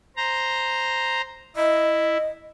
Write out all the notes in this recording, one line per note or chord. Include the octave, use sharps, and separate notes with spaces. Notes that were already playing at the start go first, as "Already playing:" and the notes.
C5 A#5
E4 D#5